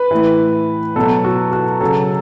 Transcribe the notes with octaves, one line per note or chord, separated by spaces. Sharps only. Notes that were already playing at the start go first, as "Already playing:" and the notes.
Already playing: B4
A2 E3
B2 F#3 A4
F#4
F#4
C#3 F#3 A4